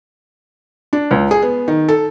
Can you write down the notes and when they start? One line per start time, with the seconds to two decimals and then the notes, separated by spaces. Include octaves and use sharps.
0.93 D4
1.11 C#2
1.31 G#4
1.42 B3
1.68 D#3
1.89 A4